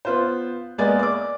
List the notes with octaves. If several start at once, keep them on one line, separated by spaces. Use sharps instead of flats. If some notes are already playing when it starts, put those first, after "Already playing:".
B3 F4 C5
G#3 A#3 B3 D5 G#5 A6
D5 D6